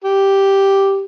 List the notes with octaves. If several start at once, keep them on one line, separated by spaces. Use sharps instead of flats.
G4